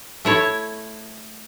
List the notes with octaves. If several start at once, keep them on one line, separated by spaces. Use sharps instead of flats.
A3 E4 C#5